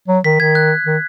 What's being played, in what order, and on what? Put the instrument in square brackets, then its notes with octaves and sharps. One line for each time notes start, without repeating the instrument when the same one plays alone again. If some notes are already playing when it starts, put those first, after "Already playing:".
[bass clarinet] F#3
[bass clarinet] D#3 [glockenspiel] B6
[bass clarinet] D#3 [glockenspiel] G#6
[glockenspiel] F#6
[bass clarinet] D#3